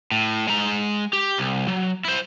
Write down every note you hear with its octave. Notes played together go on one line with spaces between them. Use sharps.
A2
G#3 A#5
G4
C2
F#3
E4 C5